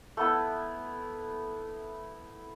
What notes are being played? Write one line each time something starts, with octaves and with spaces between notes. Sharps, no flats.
A3 B3 E4